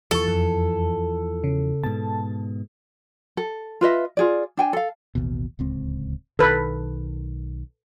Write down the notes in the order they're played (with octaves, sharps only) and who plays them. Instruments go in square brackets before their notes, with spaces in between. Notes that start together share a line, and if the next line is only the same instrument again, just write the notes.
[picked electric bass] E2 E3 F3 [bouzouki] A4 [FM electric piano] C#6 A6
[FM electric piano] F2
C#3
[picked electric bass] G#2 B2 [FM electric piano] A5
[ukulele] A4
F4 B4 D#5 E5
F4 G#4 D5
D4 G5 G#5
A4 F5
[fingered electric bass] A1 D#2 B2
D1 C#2 C4
[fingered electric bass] B1 D#3 [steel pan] A4 B4